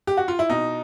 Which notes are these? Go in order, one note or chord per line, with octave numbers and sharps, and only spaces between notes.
G4
F#4
F4
E4
B2 D#4